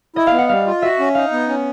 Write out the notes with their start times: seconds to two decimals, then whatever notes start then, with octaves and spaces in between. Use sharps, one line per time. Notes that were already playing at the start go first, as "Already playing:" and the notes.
0.16 E4 D#5
0.27 F5
0.33 B3
0.38 F#5
0.49 G3 F5
0.67 F4
0.82 F#4 E5
1.00 C#4
1.15 D#4 F5
1.32 B3
1.49 C#4